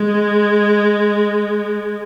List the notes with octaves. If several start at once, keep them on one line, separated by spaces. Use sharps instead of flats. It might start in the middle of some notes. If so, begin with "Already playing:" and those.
Already playing: G#3